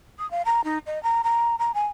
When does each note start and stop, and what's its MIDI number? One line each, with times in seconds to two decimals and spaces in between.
0.19 0.29 87
0.31 0.42 77
0.45 0.64 82
0.64 0.78 63
0.86 1.01 75
1.03 1.22 82
1.24 1.56 82
1.59 1.72 82
1.74 1.87 80